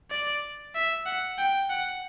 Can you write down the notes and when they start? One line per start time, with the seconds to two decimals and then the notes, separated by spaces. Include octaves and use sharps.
0.11 D5
0.75 E5
1.06 F#5
1.38 G5
1.70 F#5